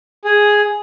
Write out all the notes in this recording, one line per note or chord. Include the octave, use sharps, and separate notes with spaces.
G#4